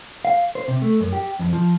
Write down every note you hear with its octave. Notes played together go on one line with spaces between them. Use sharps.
F5
C5
C3
A3
F#2
G4
F2
F3